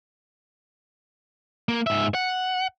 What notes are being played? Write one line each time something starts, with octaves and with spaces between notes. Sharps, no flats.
A#3
G#2 E5
F#5